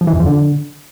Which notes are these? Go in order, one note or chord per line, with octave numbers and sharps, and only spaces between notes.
F3
E3
F2
F3
D3